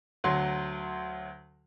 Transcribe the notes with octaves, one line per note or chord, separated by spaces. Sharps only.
D2 F#3 C6